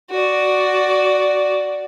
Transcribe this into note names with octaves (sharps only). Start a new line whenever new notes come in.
F#4 D5